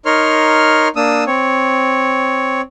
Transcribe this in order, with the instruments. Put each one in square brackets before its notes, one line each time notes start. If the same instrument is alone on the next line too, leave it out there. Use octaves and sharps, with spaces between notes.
[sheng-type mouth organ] D#4 A#4 C#5 C6 F6
A#3 D4 D#6 E6
C4 C#5